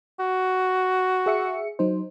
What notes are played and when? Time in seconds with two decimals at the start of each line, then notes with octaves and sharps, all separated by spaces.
0.20 F#4
1.26 G#4 E5 C#7
1.79 F#3 D#4 C5